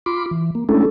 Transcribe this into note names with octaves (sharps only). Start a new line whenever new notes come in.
F4 B5 C6 D6
E3
A#3
G#3 A3 C#4 D4 E4 A4